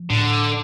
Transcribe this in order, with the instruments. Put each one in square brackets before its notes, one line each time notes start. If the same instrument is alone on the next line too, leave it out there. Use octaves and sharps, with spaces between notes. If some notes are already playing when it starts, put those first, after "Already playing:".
Already playing: [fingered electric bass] F3
[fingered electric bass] A2 [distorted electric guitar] D3